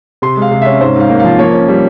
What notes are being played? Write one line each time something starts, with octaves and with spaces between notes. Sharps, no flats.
C3 C6
G#3
F5
C3
C#4 E5
G#2 C5
G#2 F5
A#3
F3 F5
A#3 C#5
C#4
G3